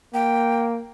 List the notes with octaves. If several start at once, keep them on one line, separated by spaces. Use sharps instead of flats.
A#3 G5